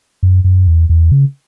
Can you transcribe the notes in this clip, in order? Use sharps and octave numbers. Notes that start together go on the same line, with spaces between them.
F#2
F#2
E2
E2
C#3